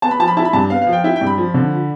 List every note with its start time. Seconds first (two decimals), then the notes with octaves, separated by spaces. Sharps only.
0.02 B3 A5
0.11 B5
0.20 F3 A5
0.28 B5
0.37 E4 A5
0.45 B5
0.53 G2 A5
0.70 B3 F5
0.82 F5
0.87 F3
0.93 G5
1.04 E4 G5
1.16 G5
1.21 G2
1.27 B5
1.38 F3
1.54 D3